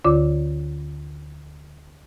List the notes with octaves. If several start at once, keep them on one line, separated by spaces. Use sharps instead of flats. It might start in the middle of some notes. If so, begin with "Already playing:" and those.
D2 D3 F4 D5 D6